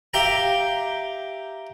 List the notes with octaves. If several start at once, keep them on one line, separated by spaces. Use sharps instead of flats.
G4 E5 F5 G5 A#5